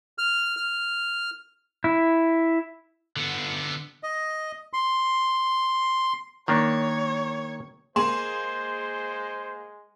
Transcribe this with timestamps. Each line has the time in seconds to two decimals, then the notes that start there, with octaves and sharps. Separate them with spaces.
0.18 F6
0.57 F6
1.84 E4
3.16 D3 B3
4.03 D#5
4.73 C6
6.48 D#3 A#3 D4 C#5
7.96 G#3 A#3 G#4 C5 C6 E7